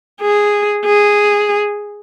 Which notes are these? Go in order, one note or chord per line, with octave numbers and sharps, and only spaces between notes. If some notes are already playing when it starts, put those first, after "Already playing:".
G#4
G#4